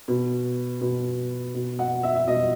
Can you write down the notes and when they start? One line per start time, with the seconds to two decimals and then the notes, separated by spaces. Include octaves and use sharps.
0.08 B2
0.81 B2
1.54 B2
1.79 F#5
2.03 E5
2.16 E5
2.27 B2 D#5